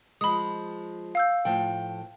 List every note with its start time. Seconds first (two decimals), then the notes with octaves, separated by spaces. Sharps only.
0.21 F3 G#3 B5 D#6
1.15 F5 E6 G6
1.45 A2 F3 G5